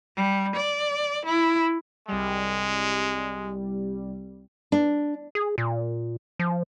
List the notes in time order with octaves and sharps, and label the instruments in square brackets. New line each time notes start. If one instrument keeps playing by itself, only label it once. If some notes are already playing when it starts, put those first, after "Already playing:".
[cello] G3
D5
E4
[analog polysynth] C2 G3 [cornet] G#3
[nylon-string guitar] D4
[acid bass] G#4
A#2
F3